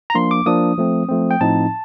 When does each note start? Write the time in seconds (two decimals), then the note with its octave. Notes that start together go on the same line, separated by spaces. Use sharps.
0.10 A#5
0.15 F3 A#3 D4 C6
0.31 D6
0.46 F3 A#3 D4 D#6
0.78 F3 A3 C4
1.09 F3 A3 C4
1.31 G5
1.41 A2 F3 C4 D#4 A5